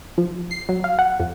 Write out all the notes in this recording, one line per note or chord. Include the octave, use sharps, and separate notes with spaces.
F3
C7
F#3
F5
F#5
F2